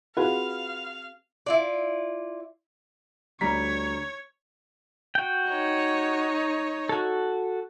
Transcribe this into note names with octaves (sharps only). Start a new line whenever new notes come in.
C4 F4 F#4 G#4 B4 F5 F#5
E4 F4 D5
D2 G3 C#5 A#5 B6
F#4 G5
D#4 C#5
F#4 A4